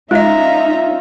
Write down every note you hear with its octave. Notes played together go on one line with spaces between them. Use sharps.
G#3 C#4 D#4 F4 D#5 E5 A#5